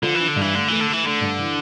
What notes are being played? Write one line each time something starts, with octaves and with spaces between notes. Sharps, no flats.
D3 F3
E3 D4
D3
G2
E3
D3 A3
E3 A3
D3
A3
E3
D3 A3
G2
E3